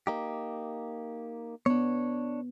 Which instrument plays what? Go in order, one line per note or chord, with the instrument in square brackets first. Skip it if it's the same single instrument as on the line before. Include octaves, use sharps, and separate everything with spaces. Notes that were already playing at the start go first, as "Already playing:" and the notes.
[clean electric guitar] A#3 D#4 G4
[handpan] B3 [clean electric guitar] D4 C#5